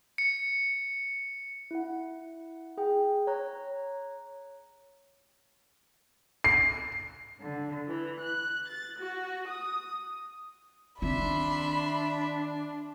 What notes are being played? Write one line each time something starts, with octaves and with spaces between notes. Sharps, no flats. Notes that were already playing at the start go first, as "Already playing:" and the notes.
C#7
E4 F#5
G#4 G5
C#5 A#5 F#6
C7
D3
E3
F#6
A6
F#4
D#6
D#3 C4 D4 E5 B5 C6